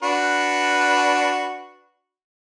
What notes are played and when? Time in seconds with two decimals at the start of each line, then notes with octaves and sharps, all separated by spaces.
0.03 D4 F#4 B4